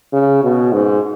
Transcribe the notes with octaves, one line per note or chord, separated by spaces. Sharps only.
C#3
B2
G#2